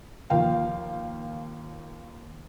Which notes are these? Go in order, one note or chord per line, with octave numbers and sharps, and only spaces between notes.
D#2 F3 F5 G5